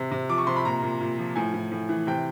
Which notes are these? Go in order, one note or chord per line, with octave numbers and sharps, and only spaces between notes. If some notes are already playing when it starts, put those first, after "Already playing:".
Already playing: C3
C3
F3 D6
C#6
C3 C6
B5
A#2 A#5
A#2
A#2
F3
A2 G#5
A2
A2
E3
C3 G5